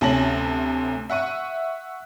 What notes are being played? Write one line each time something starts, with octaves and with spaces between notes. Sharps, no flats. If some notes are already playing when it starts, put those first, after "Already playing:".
D2 C3 C#4 A5 A#6 F#7
E5 F#5 C#6 D#7